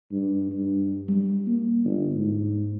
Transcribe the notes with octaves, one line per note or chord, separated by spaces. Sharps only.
G2
G2
G3
A#3
G1
G#2